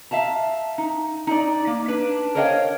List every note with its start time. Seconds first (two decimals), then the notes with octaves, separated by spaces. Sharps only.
0.11 E5 F5 A5 A#5
0.78 D#4
1.27 D#4 D5
1.67 A#3
1.88 D4 B4
2.35 A#4 C5 C#5 D#5 F5 G5